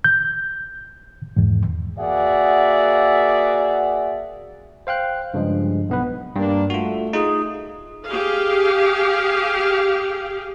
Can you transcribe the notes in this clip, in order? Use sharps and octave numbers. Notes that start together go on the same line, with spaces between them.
G6
E2 G#2
A#3 F#4 G#4 D5 E5 F#5
C5 F5 G5 F#6
G2 C#3 F3 G#3
B1 B3 B4
G2 A#3 D4
A3 F4 F#4
D#4 F4 G#4
G4 G#4 F5